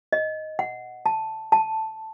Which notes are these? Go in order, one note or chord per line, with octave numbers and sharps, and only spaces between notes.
D#5
F#5
A5
A5